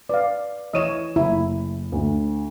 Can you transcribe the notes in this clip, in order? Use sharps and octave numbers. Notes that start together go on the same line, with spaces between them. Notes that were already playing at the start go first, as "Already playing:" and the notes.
B4 D5 F5
E3 E4 C#5 D#5 D#7 E7
F#1 E4
D2